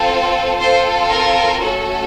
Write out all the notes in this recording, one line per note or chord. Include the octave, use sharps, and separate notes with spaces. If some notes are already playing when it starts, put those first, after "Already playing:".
Already playing: C4 F4 A4
C4 F4 A4 C5
A#4
A3 C#4 F#4 A4